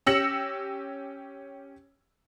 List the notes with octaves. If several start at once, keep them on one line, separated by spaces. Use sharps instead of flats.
C#4 G4 E6 A#6 C#7 F#7